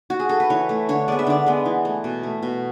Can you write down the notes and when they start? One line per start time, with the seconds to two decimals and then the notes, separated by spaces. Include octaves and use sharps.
0.10 F#4
0.20 G#4
0.29 A4
0.40 B4
0.50 E3 C#5
0.69 A3
0.89 D3 C#5
1.08 G#3 B3 D5
1.19 E5
1.27 D3 D5
1.46 G#3 B3
1.65 E3
1.85 A3
2.04 B2
2.23 A3
2.42 B2